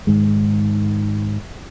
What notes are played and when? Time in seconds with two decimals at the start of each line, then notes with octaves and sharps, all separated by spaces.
0.07 G#2 D#3 G#3